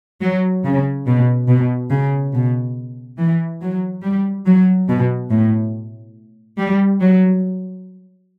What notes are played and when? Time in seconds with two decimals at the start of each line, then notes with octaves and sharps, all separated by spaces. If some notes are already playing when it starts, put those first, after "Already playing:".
0.21 F#3
0.64 C#3
1.07 B2
1.48 B2
1.90 C#3
2.33 B2
3.18 E3
3.61 F#3
4.03 G3
4.46 F#3
4.89 B2
5.30 A2
6.58 G3
7.01 F#3